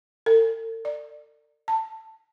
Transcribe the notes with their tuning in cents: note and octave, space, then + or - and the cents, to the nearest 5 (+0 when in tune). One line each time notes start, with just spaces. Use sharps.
A4 +45
D5 +20
A5 +15